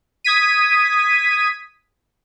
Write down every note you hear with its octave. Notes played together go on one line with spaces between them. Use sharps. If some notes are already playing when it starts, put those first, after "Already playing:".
D#6 G#6 B6 D#7